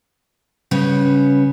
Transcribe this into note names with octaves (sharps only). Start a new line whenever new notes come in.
C#3 G3 B3 C#4